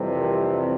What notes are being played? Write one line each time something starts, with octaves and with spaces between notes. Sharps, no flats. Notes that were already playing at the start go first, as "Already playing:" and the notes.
Already playing: F2 C3 E3 G3 C4
A#4